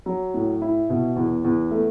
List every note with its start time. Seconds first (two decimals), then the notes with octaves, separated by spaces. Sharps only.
0.06 F#3
0.34 A2
0.62 E4
0.90 B2
1.16 E2
1.44 E2
1.71 A3